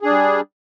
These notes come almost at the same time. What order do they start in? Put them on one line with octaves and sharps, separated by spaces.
G#4 D4 G3